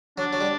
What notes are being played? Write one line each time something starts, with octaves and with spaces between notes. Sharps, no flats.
F#3 D4
F#3
G3